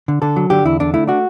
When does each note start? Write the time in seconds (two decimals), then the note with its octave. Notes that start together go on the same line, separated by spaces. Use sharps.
0.08 D3
0.22 D3 A4
0.36 F#3
0.50 D3 G4
0.64 E2 E4
0.80 D3 D4
0.94 A3 E4
1.07 D4 F#4